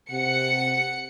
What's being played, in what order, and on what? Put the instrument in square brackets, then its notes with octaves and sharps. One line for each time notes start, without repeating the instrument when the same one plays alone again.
[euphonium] C3 [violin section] F#5 C#7